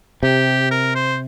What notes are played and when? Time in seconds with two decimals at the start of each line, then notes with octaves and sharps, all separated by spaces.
0.23 C3 G4
0.71 A#4
0.95 C5